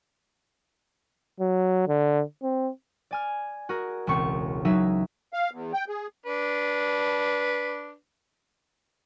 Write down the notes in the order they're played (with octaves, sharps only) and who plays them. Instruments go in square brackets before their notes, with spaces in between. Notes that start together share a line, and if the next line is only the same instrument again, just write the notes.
[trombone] F#3
D3
C4
[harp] D5 G#5 F6
F#4 G#4 A#4
E1 C#2 C4 C#6 C#7
F#3 D#4 F#4 G#4 E5
[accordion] F5
E2
G5
G#4
[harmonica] D4 B4